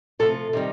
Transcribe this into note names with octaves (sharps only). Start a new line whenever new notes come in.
C3 F3 A3 A4
C3 D#3 G3